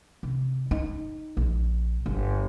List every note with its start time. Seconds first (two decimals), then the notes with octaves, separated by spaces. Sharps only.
0.23 C3
0.71 D#4
1.37 A#1
2.06 G1